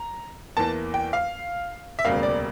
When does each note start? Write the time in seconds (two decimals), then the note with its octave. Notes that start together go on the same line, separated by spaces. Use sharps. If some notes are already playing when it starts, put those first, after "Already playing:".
Already playing: A#5
0.57 E2 E3 A#3 A5
0.94 G5
1.13 F5
1.99 E5
2.05 E1 D2 C#3 G3 A#3 F5
2.23 D5